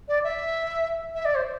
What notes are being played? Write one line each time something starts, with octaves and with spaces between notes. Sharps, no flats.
D5
E5
E5
D5
C5